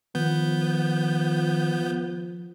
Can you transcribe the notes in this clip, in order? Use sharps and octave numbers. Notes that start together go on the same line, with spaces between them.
D#3 F3 B3 G6